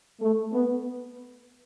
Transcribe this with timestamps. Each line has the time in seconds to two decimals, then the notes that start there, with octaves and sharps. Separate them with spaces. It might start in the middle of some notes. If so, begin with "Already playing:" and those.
0.20 A3
0.53 B3